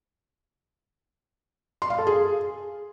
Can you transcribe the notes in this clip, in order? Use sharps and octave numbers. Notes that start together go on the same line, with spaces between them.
C6
F5
A4
G#4